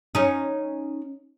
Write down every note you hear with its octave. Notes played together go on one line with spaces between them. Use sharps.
C#4 D#4